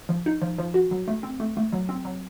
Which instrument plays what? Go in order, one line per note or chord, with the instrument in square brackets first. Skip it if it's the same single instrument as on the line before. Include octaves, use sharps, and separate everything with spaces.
[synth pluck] F3
D#4
F3
F3
F#4
F#3
A3
C4
A3
A3
F#3
C4
F#3